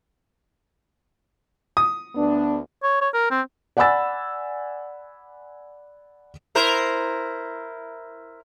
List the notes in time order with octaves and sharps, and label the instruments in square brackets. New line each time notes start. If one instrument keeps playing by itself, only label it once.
[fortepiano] D#6
[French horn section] D2 B3 D4
[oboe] C#5
C#5
A#4
C4
[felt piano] D5 F#5 G#5 B5 E6 A6
[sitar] E4 A#4 C5